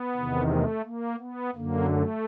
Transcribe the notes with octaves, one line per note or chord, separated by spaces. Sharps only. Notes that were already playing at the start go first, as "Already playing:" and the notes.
Already playing: B3
E2 C3 D#3
A3
A#3
B3
F#2 D3 A#3
A3